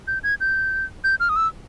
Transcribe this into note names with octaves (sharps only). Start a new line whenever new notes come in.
G6
G#6
G6
G6
F6
D#6
E6